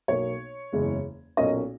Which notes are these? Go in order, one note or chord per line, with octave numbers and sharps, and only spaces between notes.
B1 B2 A#3 C#5
F#1 E2 C#3 G#3
B1 A#2 A#3 C#4 D#5